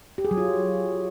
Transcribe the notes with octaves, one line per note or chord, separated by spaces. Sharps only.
G4
G#4
F#3
F4